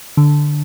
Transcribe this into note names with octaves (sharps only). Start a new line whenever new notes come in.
D3